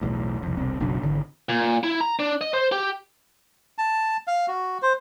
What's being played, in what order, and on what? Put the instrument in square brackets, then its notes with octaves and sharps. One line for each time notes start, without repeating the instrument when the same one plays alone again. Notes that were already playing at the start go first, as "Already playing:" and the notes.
[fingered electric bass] B1 E2 A2
C2 F2
E1 C2 C4
F#1 B1 B2 D4
G#1 D3 E3
[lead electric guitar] A#2
E4
A#5
D4
D#5
C5
G4
[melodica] A5
F5
F#4
C5